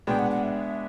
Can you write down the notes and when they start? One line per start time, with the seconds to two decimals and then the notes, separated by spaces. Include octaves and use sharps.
0.07 B2 G#3 B3 D4 G5
0.19 F#5
0.31 F#5
0.43 E5